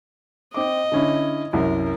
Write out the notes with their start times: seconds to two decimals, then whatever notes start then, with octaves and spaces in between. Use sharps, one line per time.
0.54 C4 D#5 D6
0.92 D3 C#4 E4
1.53 C2 F#2 A#4